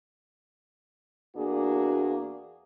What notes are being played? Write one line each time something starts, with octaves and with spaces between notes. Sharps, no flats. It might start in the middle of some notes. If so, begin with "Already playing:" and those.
E2 A#3 D4 F#4 G#4